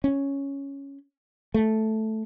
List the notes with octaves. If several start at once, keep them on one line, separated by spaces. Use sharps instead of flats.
C#4
A3